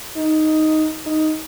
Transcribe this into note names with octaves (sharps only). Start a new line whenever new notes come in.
D#4
D#4